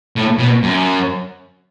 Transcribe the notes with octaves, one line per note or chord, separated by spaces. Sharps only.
A2
B2
F#2